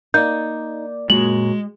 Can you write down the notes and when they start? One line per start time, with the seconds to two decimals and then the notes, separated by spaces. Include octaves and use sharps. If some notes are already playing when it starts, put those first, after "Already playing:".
0.14 A#3 D#4 D5 G6
1.10 F#2 A#2 G#3 F#7